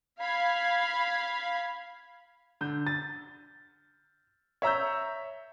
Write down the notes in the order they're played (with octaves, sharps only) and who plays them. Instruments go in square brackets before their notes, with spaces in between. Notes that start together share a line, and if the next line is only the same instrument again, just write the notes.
[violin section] F5 B5 G#6
[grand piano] D3 G6
A6
C#5 E5 A#5 E6 G6